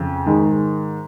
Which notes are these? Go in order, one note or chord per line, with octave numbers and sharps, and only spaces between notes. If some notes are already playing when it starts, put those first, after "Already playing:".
Already playing: F2 C#3
G#2 D#3 G#3